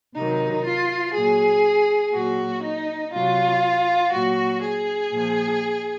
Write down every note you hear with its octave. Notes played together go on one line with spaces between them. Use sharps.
C3 D#3 F#3 D#4
F4
A#2 F#3 G#4
A#2 F#3 F#4
D#4
C3 F#3 F4
A#2 F#3 F#4
G#4
A#2 F3